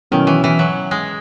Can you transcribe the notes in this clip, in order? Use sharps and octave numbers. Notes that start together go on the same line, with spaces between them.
B2 D#3 F#3 C#4 E4
E3
E3
F#3
G#3